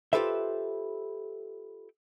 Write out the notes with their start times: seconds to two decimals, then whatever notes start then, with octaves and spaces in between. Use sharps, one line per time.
0.13 F4 G4 A4 B4 C5 E5